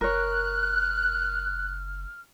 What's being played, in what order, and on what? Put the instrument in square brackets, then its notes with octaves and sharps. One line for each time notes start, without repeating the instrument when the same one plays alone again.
[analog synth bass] F#1 [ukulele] A#4 C#5 [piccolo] F6 [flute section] F#6